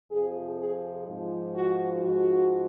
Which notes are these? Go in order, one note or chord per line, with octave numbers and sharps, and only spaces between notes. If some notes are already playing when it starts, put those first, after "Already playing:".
F2 C3 F3 G#4
G#4
G#2 F3
F#4
G#2 F3 F#4